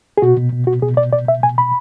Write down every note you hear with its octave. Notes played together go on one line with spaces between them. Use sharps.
G#4
B2 F#4
B2
B2
B2 F#4
B2 G#4
B2 D5
B2 D5
B2 E5
B2 G#5
B2 B5